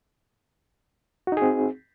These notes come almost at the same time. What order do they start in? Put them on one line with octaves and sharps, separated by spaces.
F#4 D#4 G#4 C4